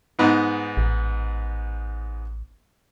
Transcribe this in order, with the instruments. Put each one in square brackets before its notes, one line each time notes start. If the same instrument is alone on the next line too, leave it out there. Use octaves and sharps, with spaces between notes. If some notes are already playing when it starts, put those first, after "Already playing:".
[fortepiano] G#2 B3 D#4
[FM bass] A1